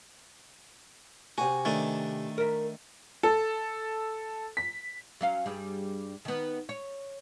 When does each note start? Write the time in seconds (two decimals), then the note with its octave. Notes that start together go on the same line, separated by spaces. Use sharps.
1.38 C3 F#4 G#5
1.65 D#3 A3 D4
2.38 A#4 E5
3.23 A4
4.57 B6
5.21 F#3 C#4 F5
5.46 G2 G3 G#4
6.25 D#3 B3
6.69 C#5